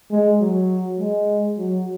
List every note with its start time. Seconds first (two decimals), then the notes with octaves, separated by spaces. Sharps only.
0.11 G#3
0.41 F#3
0.99 G#3
1.58 F#3